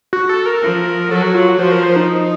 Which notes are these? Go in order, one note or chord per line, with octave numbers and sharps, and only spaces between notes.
F#4
A4
A#4
F3
F#3 A4
F#4
F4
F#4
F3 C5
A#4
C5
D#4